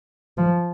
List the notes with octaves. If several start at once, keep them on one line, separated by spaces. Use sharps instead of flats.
F3